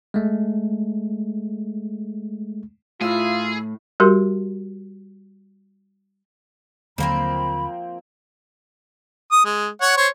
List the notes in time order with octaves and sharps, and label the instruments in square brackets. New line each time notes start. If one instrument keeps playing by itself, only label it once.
[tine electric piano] G#3 A3
[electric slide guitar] A2 [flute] E4 [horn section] F4 [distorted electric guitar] G#4
[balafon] G3 F#4 G4 A#4 C6
[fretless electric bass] D#2 D3 F#3 [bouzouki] F3 A#3 C4 [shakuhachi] B5
[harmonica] D#6
G#3
C#5 F#5
C5 C#5